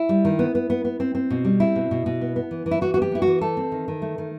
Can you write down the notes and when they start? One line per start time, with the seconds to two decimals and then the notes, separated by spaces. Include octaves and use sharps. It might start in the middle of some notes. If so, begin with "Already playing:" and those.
Already playing: E4
0.09 G3
0.25 D#3
0.39 B3
0.55 B3
0.70 B3
0.85 B3
1.00 C4
1.15 C4
1.30 B2
1.45 G3
1.60 C4 E4
1.76 B2
1.91 B2
2.06 B2
2.21 B3
2.36 B3
2.51 E3
2.66 E3
2.71 E4
2.81 E3 F#4
2.94 F#4
2.97 B3
3.02 G4
3.12 B3 E4
3.22 F#4
3.27 E3
3.41 A3 A4
3.57 C4
3.72 D#3
3.88 D#3
4.02 A3
4.18 D#3